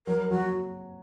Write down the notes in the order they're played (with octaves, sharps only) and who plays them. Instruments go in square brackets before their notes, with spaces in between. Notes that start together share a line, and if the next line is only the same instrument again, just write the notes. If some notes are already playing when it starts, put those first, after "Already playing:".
[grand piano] F#3 [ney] A#4
[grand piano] F#3 [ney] F#4